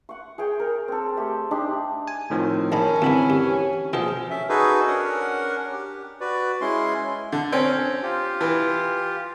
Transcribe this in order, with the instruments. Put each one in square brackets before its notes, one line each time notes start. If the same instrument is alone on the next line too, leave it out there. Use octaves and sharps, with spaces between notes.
[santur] F#5 C#6
G#4 C#5 G5 G#5
A#4
C4 A4
A3 G4 G5
D4 D#4 G4 C6
[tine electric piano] G#5
[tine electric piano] A2 D#3 F3 [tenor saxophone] C4
[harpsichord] A#1 D#5 B5 [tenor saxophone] C#4 [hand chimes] A#4 A5
[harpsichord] D2 G2 [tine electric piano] E3 B5 [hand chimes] C4 G#5
[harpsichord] G2 [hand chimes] G4
[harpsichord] A#1 B2 [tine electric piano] F3 G#4 A4
[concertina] C#4 E5
D#4 F#4 G#4 A4 B4
C#4 D4 A#4 F#5
G4
F#4 B4 D5
G#3 C#4 E4 C6
[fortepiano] D3
C4 C#4
[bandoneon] F4 G4
[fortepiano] E3